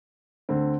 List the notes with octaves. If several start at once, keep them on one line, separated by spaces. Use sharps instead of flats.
D2 D3 C4